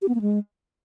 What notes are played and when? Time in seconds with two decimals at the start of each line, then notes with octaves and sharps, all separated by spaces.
0.02 G4
0.08 B3
0.15 A#3
0.21 G#3